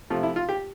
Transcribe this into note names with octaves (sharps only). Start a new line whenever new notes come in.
C3 F3 A3 F4
E4
F4
G4